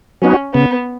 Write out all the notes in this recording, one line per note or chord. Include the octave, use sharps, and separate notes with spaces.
F#3 B3 C#4 D#4 F#4
C#3 B3